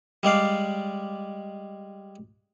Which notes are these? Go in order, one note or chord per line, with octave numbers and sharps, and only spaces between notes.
G3 G#3 D5 F5